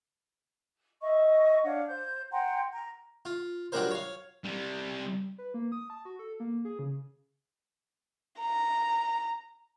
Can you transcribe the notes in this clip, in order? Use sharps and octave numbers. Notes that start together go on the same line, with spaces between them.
D#5 E5 C#6
D4 C#5 F5 F#5
C5 G6
F#5 G5 A#5 C6
A#5
F4
F#3 G3 D4 F4 A#4 C5
C#5 F5
C3 G3
B4
A#3
D#6
A5
F#4
A4
A#3
G#4
C#3
A#5